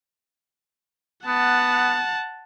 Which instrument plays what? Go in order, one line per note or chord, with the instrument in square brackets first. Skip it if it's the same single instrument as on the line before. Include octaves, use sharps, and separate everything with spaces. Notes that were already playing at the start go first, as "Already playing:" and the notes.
[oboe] B3 [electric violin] F#5 A5